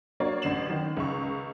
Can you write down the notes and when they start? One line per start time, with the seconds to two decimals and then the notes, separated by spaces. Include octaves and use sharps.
0.20 A#3 D4 F#4 C#5 D5
0.42 A1 D3 C7 E7 F#7
0.70 D#3
0.97 C#2 C#6